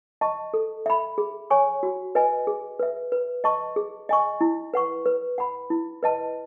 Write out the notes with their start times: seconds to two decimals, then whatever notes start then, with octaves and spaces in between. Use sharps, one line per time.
0.21 D#5 A5 C#6
0.54 A4
0.86 E5 B5
1.18 G#4
1.50 C#5 G#5 C#6
1.83 F#4
2.15 B4 D#5 G#5
2.47 G#4
2.79 B4 E5
3.12 B4
3.44 D#5 A5 C#6
3.76 G#4
4.09 D#5 G#5 C#6
4.41 E4
4.74 B4 F#5 C#6
5.06 B4
5.38 F#5 B5
5.70 E4
6.03 B4 D#5 A5